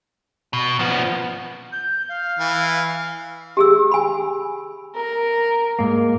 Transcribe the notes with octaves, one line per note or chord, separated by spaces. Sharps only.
B2
F3 B3
G6
F5
E3
G4 G#4 E6
G#5 B5
A#4
G#2 A#3